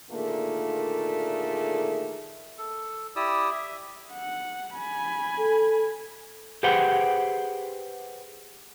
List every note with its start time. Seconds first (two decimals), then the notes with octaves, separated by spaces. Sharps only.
0.11 A#2 D3 D#3 A3 A#3 G#4
2.58 A4
3.16 E4 G4 D5 D#6 E6
3.51 E5
4.13 F#5
4.75 G#5 B5
5.39 A4
6.63 G4 G#4 B4 C5 F#5 G5